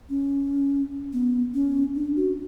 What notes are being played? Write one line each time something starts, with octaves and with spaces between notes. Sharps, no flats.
C#4
B3
C#4
D4
F#4